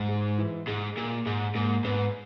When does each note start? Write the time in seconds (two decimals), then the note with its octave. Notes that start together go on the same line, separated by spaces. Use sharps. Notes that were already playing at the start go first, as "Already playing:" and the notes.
Already playing: G#2
0.08 G#3
0.38 E3
0.67 G#2 G#3
0.97 A#2 A#3
1.26 G#2 G#3
1.55 G#2 A#3
1.84 G#2 B3